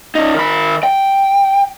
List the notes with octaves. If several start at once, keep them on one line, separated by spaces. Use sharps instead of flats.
C#4 D#4
D#3 B5
G5